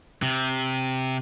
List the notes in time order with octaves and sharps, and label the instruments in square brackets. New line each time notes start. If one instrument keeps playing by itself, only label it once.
[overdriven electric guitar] C3